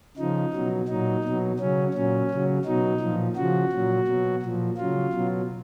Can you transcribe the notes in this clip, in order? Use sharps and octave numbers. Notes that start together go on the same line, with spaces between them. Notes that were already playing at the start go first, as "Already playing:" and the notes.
C#3 F3 D#4
B2 F#3
A#2 F#3 D#4
B2 F#3
C#3 F#3 C#4
A#2 F#3 C#4
C#3 F#3
B2 F#3 D#4
A#2 F3
C#3 F3 F#4
A#2 F#3
B2 F#3
A#2 F3
C#3 F#3 F4
B2 F#3